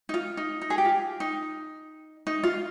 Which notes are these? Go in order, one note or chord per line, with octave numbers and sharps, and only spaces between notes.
D#4
F4
D#4
D#4
G#4
G4
F4
D#4
D#4
F4